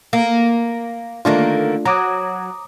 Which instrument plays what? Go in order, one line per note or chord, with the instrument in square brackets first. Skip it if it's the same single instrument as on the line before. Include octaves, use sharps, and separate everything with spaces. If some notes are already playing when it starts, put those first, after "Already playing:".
[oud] A#3
[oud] D3 D#3 A#3 [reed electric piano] A3 D4 F4
[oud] F#3 [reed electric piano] A#5 D6 D#6